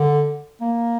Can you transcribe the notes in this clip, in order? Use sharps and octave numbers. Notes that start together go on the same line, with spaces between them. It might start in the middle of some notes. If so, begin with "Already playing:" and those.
Already playing: D3
A#3